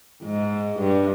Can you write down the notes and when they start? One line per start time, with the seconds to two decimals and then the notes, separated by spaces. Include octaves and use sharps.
0.23 G#2
0.78 G2